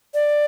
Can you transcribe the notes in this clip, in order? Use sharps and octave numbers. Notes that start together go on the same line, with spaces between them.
D5